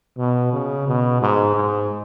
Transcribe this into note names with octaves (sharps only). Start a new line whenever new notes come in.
B2
C#3
B2
G#2
G#2